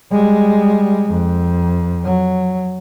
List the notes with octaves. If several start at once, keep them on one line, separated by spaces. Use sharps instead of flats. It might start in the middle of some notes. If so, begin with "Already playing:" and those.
G3 G#3
F2
F#3